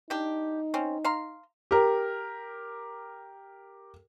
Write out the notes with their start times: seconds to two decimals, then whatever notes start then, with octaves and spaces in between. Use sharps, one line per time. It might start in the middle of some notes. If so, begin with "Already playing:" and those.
0.10 D4 D#4 G4
0.74 C4 C#4
1.04 F5 A#5 C6
1.71 G4 A#4